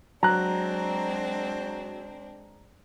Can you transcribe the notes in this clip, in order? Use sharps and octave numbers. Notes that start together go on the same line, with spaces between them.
F#3 G#3 C4 D4 A#5 F#6